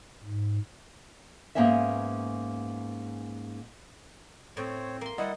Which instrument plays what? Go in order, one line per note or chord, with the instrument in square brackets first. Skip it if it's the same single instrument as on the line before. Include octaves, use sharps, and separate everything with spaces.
[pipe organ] G#2
[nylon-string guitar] G#2 A#3 B3 C#4 E5
[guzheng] A2 [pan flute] C4 [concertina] C5 C#5
[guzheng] A#3 C6
[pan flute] G3 [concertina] E4 F#5 [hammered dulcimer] D#5